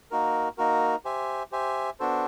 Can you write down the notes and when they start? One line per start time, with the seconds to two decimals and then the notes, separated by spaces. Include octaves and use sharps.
0.11 A#3 D#4 F#4 A#4
0.58 A#3 D#4 F#4 A#4
1.05 G4 C5 E5 G#5
1.52 G4 C5 E5 G#5
2.00 B3 D4 F#4 A4 C5